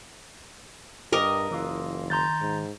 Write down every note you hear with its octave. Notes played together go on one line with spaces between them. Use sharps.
G2 G4 A#4 D#5
F#1 E3 F4
D#3 F5 A#5 C6 G6 A6
G#2